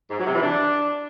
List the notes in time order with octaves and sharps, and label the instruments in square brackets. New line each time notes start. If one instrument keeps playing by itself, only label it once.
[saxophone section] G#2
F#3
C3
E3
D4